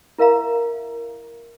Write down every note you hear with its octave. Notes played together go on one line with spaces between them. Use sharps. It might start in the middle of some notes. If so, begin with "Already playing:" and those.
E4 A#4 E5 F5 A#5